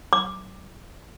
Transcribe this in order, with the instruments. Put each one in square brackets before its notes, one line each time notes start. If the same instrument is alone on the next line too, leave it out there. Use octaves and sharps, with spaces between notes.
[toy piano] D6